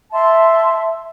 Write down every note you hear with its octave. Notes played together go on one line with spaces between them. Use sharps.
D#5 E5 A5 C6